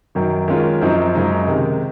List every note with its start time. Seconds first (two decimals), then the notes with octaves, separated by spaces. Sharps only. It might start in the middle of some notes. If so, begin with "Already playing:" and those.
0.15 F#2 D#3 F#3
0.48 D#3 G#3 C#4 F4
0.81 F#2 F3 C4 D#4
1.15 F#2 C#3 G#3 D#4
1.48 C3 D#3 G#3